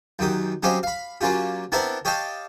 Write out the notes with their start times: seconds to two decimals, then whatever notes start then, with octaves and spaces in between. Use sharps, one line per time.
0.19 F#2 D#3 G4 D#6
0.63 F#3 C4 C#4 G4 D#5 F5
0.83 F5 B5
1.21 F#3 A#3 C#4 F4 G4
1.72 B3 C4 D4 E4 A#4 F#5
2.05 G4 C#5 D#5 F5 G5 A5